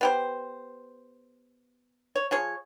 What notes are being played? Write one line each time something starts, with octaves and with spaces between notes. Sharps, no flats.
B3 G4 C5
C#5
F3 G#4 C#5